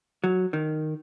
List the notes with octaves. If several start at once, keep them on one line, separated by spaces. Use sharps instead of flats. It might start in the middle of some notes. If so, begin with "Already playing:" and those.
F#3
D#3